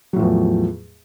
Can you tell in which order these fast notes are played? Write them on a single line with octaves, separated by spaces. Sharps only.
F#3 A2 F3 E2